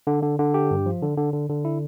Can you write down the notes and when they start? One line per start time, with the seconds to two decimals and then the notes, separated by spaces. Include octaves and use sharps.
0.07 D3
0.23 D3
0.39 D3
0.54 G4
0.71 G2
0.86 F3
1.02 D3
1.18 D3
1.33 D3
1.49 D3
1.65 E4